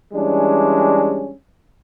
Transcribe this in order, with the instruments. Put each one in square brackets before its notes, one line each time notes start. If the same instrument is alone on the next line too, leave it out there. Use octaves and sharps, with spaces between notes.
[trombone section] E3 G3 G#3 C#4 D4